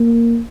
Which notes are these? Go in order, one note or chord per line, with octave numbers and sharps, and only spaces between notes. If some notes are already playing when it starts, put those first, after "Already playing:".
Already playing: A#3